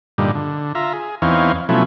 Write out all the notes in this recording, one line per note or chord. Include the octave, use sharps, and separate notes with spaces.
G2 A#2 D3 G3 D#4
D3
F4 E5 A#5
G#4
E2 E3 C4 D#4 C#5 F5
B2 F3 F#3 A3 C#4 E4